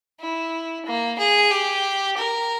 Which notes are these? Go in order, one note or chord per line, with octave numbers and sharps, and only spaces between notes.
E4
A#3
G#4
G4
A#4